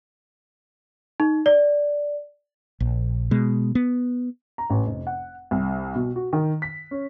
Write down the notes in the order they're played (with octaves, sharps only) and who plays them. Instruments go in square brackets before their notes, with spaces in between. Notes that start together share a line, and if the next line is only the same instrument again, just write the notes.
[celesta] D#4
D5
[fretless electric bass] A#1
B2 G#3
B3
[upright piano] A#5
A1
F1
F#5
C2
B2
F#4
D#3
B6
C#4